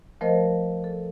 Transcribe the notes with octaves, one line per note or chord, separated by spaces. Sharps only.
F3 A3 A#4 C5 D#5
A4